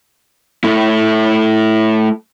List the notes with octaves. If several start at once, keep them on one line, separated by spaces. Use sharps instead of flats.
A3 E4